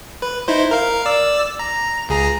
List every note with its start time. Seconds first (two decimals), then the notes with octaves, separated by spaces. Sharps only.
0.22 B4
0.48 D#4 E4 C5
0.71 A#4 F5
1.06 D5 E6
1.59 A#5
2.09 C#2 G#4 A#5